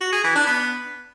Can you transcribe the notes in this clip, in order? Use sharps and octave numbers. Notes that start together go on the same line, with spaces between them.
F#4
G#4
E3
D4
B3